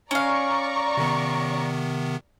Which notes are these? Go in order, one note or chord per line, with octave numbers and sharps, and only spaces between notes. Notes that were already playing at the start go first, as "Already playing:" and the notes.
C#4 D5 F5 A#5 C#6
C3 D#3 B3